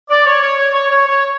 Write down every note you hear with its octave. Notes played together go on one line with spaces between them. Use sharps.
D5
C#5
C#5
C#5
C#5
C#5
C#5